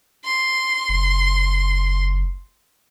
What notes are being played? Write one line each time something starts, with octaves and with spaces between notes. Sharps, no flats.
C6
F#1